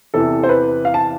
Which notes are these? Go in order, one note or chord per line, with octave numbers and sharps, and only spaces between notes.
E2 C3 E3 A4
C5
B4
F5
A5